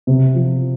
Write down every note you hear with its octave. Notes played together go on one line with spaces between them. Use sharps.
C3
F3